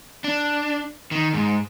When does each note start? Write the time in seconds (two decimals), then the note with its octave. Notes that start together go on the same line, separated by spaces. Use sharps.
0.24 D4
1.11 D#3
1.34 G#2